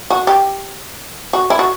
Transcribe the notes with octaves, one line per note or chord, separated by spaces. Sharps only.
F#4
G4
F#4
E4
F#4